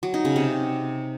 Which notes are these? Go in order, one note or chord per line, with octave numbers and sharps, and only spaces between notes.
F#3
D#4
C#3
C3